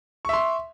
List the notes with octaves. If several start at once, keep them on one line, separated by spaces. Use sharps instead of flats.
E5 C6 C#6